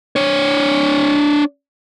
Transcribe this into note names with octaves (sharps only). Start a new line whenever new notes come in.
D4 C#5